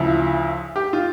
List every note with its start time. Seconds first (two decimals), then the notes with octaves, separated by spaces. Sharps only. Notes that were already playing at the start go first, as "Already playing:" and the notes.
Already playing: D2 C#3 F3 E4
0.76 G4
0.93 F4